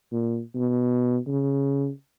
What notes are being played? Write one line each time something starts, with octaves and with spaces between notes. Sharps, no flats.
A#2
B2
C#3